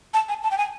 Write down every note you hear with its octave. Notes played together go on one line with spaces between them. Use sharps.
A5
G#5
A5
G5
G#5